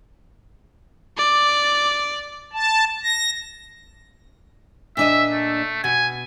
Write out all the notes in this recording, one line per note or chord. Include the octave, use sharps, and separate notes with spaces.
D5
A5
A#6
A#2 D4 D#5 E5
A3
B2 G#5